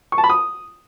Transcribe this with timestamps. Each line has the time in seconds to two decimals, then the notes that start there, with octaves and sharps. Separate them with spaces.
0.12 C#6
0.18 A5
0.24 B5
0.30 D#6